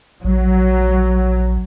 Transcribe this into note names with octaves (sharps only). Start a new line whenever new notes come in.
A#1 F#3